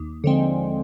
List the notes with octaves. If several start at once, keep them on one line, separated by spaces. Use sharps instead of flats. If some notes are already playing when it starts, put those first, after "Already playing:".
Already playing: D#2
D3 F3 G#3 C4